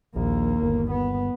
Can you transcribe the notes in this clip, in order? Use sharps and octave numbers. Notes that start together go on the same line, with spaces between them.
A#1 D#2 A#3
G1
B3